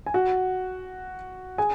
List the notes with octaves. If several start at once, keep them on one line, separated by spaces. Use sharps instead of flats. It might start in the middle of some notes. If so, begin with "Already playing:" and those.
G#5
F#4 F#5
G#4 G#5